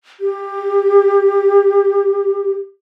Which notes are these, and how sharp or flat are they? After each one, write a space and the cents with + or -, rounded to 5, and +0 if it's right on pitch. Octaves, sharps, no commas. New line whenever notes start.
G4 +20